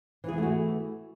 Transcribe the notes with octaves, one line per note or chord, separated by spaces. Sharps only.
E3 A3 B3 F#4 G#4